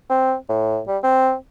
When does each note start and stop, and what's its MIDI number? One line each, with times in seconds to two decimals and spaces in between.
0.09 0.34 60
0.49 0.79 45
0.88 0.98 55
1.03 1.33 60